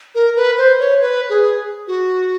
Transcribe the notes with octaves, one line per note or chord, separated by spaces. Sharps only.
A#4
B4
C5
C#5
B4
G#4
F#4